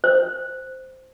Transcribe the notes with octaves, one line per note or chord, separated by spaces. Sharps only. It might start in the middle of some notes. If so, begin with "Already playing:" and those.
C5